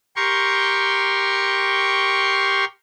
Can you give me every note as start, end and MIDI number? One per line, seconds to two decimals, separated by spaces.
0.16 2.65 67
0.16 2.65 70
0.16 2.65 79
0.16 2.65 84
0.16 2.65 85